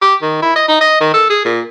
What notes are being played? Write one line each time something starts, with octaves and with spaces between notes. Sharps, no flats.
G4
D#3
E4
D#5
D#4
D#5
D#3
A4
G#4
A#2